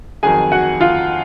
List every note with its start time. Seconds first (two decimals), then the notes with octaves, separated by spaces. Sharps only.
0.23 F2 D#3 F#3 G#4 G#5
0.52 F#4 F#5
0.81 F4 F5